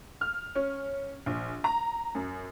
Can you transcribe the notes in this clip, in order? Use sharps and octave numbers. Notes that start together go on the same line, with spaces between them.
F6
C#4
A#1
A#5
F#2